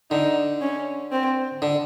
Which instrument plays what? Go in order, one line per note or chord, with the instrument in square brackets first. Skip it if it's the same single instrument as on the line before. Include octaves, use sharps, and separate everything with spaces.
[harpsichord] D3 [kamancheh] D#4
[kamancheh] C#4
C4
[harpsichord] D3